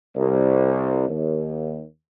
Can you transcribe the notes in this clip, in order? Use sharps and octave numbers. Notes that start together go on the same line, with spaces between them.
C2
D#2